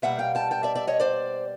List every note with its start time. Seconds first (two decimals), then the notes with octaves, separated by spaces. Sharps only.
0.02 B2 G3 A#3 E5 F#5
0.19 F5 G5
0.35 G5 A5
0.51 G5 A5
0.63 D5 E5
0.75 D5 E5
0.87 C#5 D#5
1.00 C5 D5